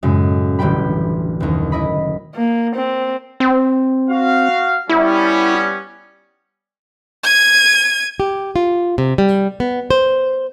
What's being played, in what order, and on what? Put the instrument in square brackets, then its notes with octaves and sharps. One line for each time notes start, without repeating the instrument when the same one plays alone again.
[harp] F#2 A2 C#3 G#3
E1 A1 D3 G3 G5 B5
F#1 D#2
E4 D#5 B5
[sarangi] A#3
C4
[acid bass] C4
[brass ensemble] F#4 F5
[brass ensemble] G3 B3 C#4 [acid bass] E4
[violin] G#6 D#7
[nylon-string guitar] G4
F4
C3
G3
B3
C5